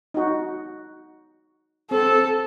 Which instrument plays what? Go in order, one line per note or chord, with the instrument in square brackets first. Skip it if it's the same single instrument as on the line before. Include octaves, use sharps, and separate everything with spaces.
[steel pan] D#4 F#4
[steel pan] C4 [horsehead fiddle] A4